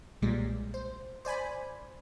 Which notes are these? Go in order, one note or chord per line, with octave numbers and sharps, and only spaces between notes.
B1 A#2 G3 G#3
C5
C5 D5 G#5 B5